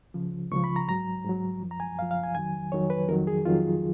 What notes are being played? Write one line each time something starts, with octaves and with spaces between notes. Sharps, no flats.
C#2 C#3 F3
C#2 C#3 F3 C#6
B5
A#5
G#2 F#3 A#5
G#2 F#3
F#2 F3
A#5
G#5
F#2 F3 F5
F5
G#5
F2 D#3 F#3 G#5
F2 D#3 F#3 C#5
B4
F2 D#3 F#3 A#4
G#4
F2 D#3 F#3 F4